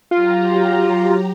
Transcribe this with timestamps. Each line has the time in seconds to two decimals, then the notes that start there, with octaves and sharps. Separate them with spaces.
0.11 F#3 F4 G4 A#5